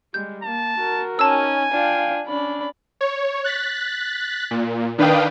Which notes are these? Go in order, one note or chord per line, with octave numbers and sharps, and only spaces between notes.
G3 G#3 G6
A#3 A5
F#4 A#4
C#4 D#4 G#5 A5 E6
D4 F4 F5 G5
C#4 D4 D5 B5
C#5
F#6 A6 B6
A#2
D#3 D4 B4 F5 G5 D#6